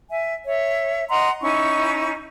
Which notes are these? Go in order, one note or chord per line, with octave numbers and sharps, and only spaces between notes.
E5 G#5
C#5 E5
D#5 F#5 A#5 C6
C#4 D#4 E4 C#6